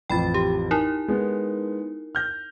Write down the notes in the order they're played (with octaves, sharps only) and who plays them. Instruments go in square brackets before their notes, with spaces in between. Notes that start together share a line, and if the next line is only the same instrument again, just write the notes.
[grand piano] A1 F2 [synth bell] G5 B5 A6
[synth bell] G4
D#4 E4 A#4
[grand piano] G#3 B3
F6 G6 A#6